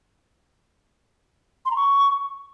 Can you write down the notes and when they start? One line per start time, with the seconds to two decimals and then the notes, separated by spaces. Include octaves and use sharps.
1.65 C6
1.71 A#5
1.76 C#6